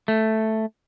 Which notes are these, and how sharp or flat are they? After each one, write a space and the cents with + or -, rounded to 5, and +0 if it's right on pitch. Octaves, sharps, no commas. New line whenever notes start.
A3 +0